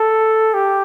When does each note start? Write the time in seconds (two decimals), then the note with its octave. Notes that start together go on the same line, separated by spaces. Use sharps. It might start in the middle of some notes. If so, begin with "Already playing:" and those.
Already playing: A4
0.54 G4